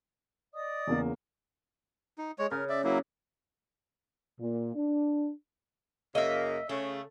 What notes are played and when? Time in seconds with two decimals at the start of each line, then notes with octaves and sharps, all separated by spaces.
0.53 D5 D#5 D#6
0.87 E2 C#3 A#3
2.18 D#4
2.39 G#3 C#5
2.51 C#3 A#4
2.69 D5 E5
2.84 F#3 A#3 E4
4.40 A#2
4.75 D4
6.15 F#2 C#3 A#3 D#5 E5
6.69 C#3 A3